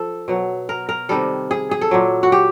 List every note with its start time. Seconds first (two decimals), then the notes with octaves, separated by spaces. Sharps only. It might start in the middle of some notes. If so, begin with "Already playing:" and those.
Already playing: F3 A4
0.28 B2 F#3
0.69 A#4
0.89 A#4
1.09 C3 D#3 G3 A4
1.51 G#4
1.71 G#4
1.81 A4
1.91 A#2 F#3
2.23 F#4
2.32 G4